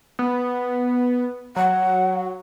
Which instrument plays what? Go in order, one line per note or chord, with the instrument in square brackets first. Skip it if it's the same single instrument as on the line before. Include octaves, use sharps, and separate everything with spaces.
[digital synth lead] B3
[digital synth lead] F#3 [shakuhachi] F#5